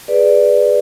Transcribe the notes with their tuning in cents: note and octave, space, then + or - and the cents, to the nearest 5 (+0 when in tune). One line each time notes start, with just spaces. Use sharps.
G#4 +0 B4 +0 D5 +5